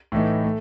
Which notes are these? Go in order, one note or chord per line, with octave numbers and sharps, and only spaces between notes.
A2 E3 A3 D#4
A3